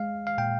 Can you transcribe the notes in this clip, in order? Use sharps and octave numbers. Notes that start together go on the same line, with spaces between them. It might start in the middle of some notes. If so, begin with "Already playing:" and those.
Already playing: G#3 F5
F5
A#2 G5